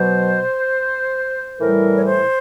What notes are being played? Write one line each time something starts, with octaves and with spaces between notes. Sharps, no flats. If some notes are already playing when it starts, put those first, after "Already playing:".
Already playing: B2 F#3 C5
A2 E3 G3 A#4
C#5
C5